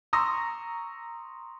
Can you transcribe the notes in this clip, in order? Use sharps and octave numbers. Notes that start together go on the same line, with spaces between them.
A#5 C6 C#6 D#6 E6 A#6